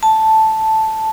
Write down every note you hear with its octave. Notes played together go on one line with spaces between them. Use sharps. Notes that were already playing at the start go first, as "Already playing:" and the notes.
A5